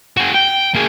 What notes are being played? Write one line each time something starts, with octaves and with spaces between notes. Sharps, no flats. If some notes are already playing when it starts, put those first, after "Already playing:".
F#4 G#4
G5
A#3 G#4